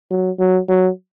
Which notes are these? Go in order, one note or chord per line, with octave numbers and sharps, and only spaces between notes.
F#3
F#3
F#3